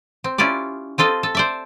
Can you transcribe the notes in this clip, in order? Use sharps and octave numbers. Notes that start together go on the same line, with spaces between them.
C4
C#4 E4 F4 G4 D5
C4 F4 A4 D#5
A4
C5 D5 E5